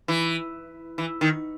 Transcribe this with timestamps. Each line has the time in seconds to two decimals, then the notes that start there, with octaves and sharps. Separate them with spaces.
0.08 E3
0.98 E3
1.21 D#3